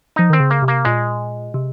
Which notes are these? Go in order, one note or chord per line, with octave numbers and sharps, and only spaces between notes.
F3 D#4
D#3 C4
C#3
A#3
C3
A#3
A#2 G#3
C3